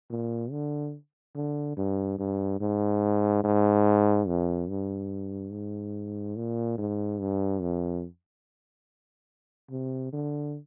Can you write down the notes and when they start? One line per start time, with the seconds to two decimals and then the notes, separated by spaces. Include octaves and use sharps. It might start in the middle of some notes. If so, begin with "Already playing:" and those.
0.10 A#2
0.51 D3
1.35 D3
1.77 G2
2.19 G2
2.61 G#2
3.44 G#2
4.28 F2
4.69 G2
5.52 G#2
6.36 A#2
6.78 G#2
7.20 G2
7.62 F2
9.71 C3
10.13 D3